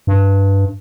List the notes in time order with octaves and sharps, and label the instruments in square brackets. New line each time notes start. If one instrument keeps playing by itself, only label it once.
[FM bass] G2